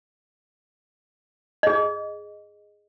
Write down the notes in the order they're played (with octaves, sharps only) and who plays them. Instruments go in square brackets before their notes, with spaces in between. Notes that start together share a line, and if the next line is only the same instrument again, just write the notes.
[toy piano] G#4 D#5